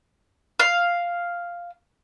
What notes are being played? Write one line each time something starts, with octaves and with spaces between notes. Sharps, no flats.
F5